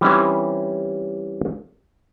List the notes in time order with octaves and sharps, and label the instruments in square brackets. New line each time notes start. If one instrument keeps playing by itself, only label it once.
[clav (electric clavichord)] E3 G3 C4 C#4 D#4 E4